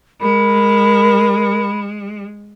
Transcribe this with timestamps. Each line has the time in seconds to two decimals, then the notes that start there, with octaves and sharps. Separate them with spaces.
0.21 G#3 A#4 B5